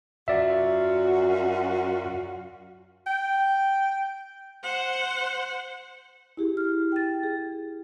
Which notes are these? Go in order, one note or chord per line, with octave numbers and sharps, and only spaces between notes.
F#2 F4 F#4 D5 E5
G5
C5 F#5
E4 G4 G#4
F6
G5 A6
G#4